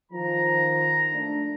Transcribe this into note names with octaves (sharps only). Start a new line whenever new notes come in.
D#3 F3 A#5
A3 D4